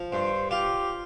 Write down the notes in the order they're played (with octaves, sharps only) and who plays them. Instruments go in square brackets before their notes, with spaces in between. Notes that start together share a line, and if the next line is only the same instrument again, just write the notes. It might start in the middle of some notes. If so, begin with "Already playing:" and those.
Already playing: [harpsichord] F3
[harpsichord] G2 [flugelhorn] C5
[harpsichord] F4 [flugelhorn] G4